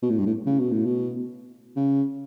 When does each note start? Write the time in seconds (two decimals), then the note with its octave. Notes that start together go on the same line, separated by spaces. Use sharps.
0.02 B2
0.10 A2
0.18 G2
0.26 A2
0.46 C#3
0.59 B2
0.72 A2
0.85 B2
1.76 C#3